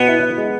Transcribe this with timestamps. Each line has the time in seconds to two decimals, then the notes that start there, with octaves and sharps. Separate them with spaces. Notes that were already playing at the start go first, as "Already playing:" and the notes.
Already playing: B2 B3
0.08 E4
0.23 E4
0.38 G#3